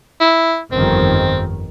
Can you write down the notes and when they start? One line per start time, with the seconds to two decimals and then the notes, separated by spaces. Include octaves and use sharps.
0.20 E4
0.72 G1 F2 D#3 C4